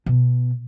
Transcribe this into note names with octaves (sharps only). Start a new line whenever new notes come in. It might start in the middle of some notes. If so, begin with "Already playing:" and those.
B2